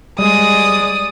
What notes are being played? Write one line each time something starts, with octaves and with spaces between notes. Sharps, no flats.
G3 G#3 D5 D#6